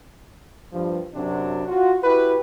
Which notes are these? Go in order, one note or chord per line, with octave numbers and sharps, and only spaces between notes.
G2 F3
F#2 C3 F#3 C4 D4
F4 F#4
E4 F#4 G4 B4